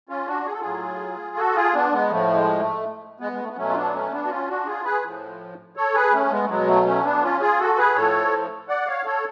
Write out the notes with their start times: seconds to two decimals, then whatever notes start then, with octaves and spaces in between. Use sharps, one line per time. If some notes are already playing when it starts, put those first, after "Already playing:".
0.09 C#4 F4
0.27 D4 F#4
0.46 G#4
0.53 A4
0.61 A2 F#3 F4 G#4
1.37 F#4 A4
1.55 F4 G#4
1.74 B3 D4
1.92 G#3 B3
2.10 A2 F3 A3
2.35 G#3
2.59 A3
3.20 G#3 B3
3.32 G#3
3.41 A3
3.49 B3
3.57 B2 F#3 A3 C#4
3.69 F4
3.75 B3 D4
3.93 A3 C#4
4.12 B3 D4
4.25 F#4
4.30 C#4 F4
4.48 D4 F#4
4.66 F4 G#4
4.84 G#4 B4
5.03 A2 F3
5.77 A4 C#5
5.94 G#4 B4
6.13 A3 C#4
6.26 A3
6.31 G#3 B3
6.45 A3
6.49 B2 F#3 G#3 B3
6.68 A3
6.86 A3 C#4
7.04 B3 D4
7.22 C#4 F4
7.41 F4 G#4
7.59 F#4 A4
7.78 G#4 B4
7.95 A2 F3 A4 C#5
8.69 D5 F#5
8.87 C#5 F5
9.05 A4 C#5